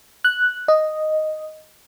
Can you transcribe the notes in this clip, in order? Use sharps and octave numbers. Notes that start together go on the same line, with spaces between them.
F#6
D#5